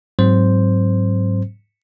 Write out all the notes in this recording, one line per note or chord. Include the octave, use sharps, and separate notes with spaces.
G#2 F#3 C4 C5